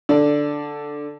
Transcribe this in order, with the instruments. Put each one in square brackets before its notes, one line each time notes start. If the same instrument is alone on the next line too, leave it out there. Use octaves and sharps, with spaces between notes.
[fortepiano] D3 D5